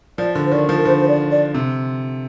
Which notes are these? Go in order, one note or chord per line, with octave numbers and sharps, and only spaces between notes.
F3 D5
D3
C5
D#3 D5
F3
A#4
D3 C5
C5
D5
D5
C3